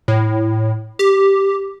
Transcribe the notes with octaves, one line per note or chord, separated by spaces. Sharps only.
A2
G4